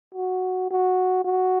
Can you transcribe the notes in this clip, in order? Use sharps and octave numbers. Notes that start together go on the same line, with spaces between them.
F#4
F#4
F#4